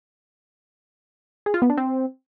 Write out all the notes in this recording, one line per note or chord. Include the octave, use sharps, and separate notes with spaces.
G#4
F4
B3
D4
C4